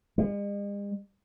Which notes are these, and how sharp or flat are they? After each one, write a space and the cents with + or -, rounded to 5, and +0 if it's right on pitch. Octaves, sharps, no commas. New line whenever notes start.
G#3 -45